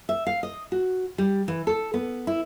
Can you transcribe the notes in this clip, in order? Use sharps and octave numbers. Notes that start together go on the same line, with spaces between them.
E5
F5
D#5
F#4
G3
E3
A4
B3
E4